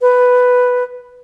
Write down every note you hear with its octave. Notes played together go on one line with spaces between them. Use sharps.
B4